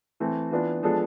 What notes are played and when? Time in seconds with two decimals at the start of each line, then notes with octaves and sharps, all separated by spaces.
0.20 E3 A3 C4
0.51 E3 B3 D4 F4
0.83 F3 G#3 B3 D4 A4